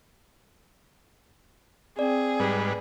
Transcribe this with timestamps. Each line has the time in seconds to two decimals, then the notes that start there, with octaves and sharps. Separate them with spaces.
1.99 C4 G#4 D5
2.40 G#2 G3 B4